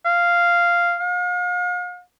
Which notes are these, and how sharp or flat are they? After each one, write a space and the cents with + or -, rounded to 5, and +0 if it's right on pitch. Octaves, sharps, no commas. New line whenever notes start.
F5 -5
F5 +45